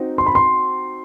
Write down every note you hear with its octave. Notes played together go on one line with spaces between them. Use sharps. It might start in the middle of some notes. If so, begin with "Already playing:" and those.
Already playing: C4 D#4 F#4
C6
B5
C6